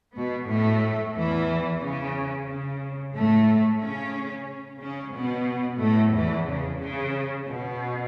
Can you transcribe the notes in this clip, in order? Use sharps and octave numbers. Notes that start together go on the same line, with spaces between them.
B2 B3
A2 A3
E2 E3
C#3
C#3
A2 A3
C#3 C#4
C#3 C#4
B2 B3
A2 A3
E2 E3
C#3
C#3
B2